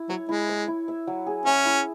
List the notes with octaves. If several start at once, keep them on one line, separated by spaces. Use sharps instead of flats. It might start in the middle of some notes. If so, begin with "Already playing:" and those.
Already playing: E4
F#3 C#5
G#3 E4
C#5
E4
E5
F#3
G#4
C#4 E5
E4